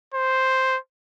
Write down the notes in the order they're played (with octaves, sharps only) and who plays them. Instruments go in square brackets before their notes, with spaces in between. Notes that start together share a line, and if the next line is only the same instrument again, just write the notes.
[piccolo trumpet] C5